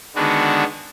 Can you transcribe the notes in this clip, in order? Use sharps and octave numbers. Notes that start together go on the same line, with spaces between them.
D3 D#3 G#3 B3 D4 F#4